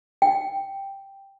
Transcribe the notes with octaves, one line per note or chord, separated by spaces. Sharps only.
G5